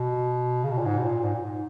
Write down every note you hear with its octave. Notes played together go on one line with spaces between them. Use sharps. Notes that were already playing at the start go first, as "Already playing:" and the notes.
Already playing: B2
C#3
B2
A#2
G#2
B2
A#2
G#2
A#2
G#2